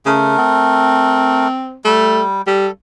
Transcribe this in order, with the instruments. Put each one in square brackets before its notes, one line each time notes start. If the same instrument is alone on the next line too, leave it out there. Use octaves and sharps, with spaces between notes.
[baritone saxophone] C#3 [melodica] A3 A#4
[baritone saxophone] C4
[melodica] G3 [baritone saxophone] A3
[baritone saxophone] G3 [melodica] A4